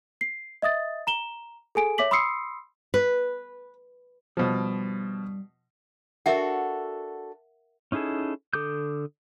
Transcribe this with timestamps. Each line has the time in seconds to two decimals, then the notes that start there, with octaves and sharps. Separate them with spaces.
0.21 C7
0.62 D#5 E5 D#6 A6
1.07 A#5 E7 G7
1.75 G#4 A4 G#5 D7
1.98 C#5 E5 D6 B6 F#7
2.11 B5 C6 D#6 E6 C7 C#7
2.94 B4
4.37 G2 B2 F3 G3
6.26 D4 F#4 A4 A#4 E5 F#5
7.92 C#4 D#4 E4 G#4 A4
8.53 D3 A4 D6 D#6 G6